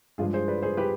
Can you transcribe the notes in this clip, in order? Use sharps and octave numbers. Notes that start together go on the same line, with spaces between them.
G2 F3 G#3 F4 G#4
G#4 C5
B4 D5
G#4 C5
G4 B4